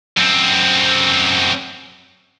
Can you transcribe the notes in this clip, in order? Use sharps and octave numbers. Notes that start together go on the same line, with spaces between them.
F#2 C4